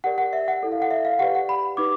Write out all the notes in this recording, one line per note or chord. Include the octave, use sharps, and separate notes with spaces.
G4 A#4 D5 F#5
F#5
E5
F#5
E4 A4 D5
F5
F#5
E5
F5
G4 B4 D5 F#5
F#5
B5
D#4 G4 B4 D6